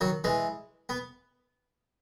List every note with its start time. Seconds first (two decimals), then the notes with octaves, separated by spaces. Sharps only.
0.01 D#3 F#3
0.24 E3 G#3
0.89 B3